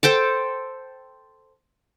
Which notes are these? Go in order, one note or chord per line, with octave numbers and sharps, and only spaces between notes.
A4 C5 G5 A5